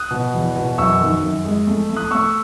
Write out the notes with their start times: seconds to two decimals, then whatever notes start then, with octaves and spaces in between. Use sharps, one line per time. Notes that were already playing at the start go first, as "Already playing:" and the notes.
Already playing: D#6 F#6
0.11 B2
0.34 E2
0.56 B2
0.78 F#2 C#6 E6
1.01 D#3
1.22 F#2
1.45 G#3
1.67 A3
1.89 A3
1.96 D#6 F#6
2.11 A3 C#6 E6